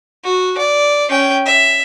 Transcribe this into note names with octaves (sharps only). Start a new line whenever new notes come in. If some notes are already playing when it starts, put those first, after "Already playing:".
F#4
D5
C#4 G5
E5